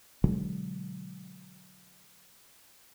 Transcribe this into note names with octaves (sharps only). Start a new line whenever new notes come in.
B2 D3 F#3 G#3